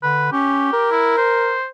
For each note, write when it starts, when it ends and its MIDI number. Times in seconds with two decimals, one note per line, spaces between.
0.03 0.32 50
0.03 0.30 71
0.32 0.69 61
0.32 0.87 67
0.73 1.56 70
0.91 1.17 64
1.18 1.66 72